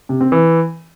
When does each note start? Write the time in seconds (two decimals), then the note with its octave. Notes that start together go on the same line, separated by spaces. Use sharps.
0.09 C3
0.21 C4
0.32 E3